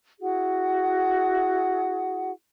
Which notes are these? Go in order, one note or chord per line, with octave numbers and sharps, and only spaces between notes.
E4 F#4 G#4 F#5